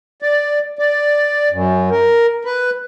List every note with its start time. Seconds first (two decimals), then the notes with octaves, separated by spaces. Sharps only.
0.22 D5
0.79 D5
1.51 F#2
1.91 A#4
2.45 B4